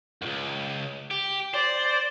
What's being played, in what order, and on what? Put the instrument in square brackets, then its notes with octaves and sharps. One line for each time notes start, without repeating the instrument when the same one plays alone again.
[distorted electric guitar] C#2 F#2
G4
[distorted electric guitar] C5 [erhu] D5